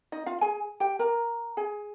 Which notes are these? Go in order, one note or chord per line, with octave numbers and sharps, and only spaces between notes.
D#4 D#5
F4 F5
G#4 G#5
G4 G5
A#4 A#5
G#4 G#5